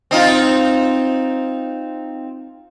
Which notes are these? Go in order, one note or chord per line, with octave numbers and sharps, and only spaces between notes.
C4 D#4 F4